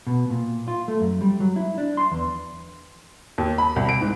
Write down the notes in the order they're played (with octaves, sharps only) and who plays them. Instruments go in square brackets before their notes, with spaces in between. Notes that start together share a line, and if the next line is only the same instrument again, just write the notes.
[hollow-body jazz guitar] B2
A#2
F4
A3
F#2
G3
F#3
E4
D4
C6
E2
[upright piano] D#2
B5
C2
D7
G#2